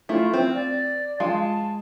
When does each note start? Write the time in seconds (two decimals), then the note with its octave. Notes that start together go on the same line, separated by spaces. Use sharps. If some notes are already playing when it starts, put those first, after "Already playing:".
0.09 A3 E4 F4
0.34 C4
0.54 D5
1.20 G#3 F4 A5